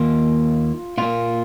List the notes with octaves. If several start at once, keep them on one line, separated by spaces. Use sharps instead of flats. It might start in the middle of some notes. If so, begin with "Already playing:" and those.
Already playing: D#2 D#3 A#3 F4
A#2 A#3 F4